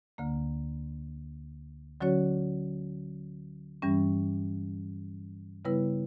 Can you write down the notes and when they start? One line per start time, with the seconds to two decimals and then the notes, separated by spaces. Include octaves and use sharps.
0.18 D2 D3 A#3
2.01 D3 F#3 C#4 F#4 C#5
3.82 G2 E3 G3 C#4
5.65 C#3 G3 B3 E4 B4